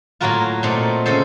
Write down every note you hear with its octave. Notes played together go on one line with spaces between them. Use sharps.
A2 F#3 A#3 F4 F#4 A#4
A#2 A3 C4 D#4
C#3 A4 C5